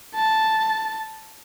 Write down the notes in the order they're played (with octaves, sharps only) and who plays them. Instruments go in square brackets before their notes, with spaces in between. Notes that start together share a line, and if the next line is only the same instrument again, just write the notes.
[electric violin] A5